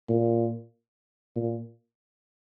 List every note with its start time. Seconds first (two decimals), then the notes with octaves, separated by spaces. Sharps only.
0.09 A#2
1.36 A#2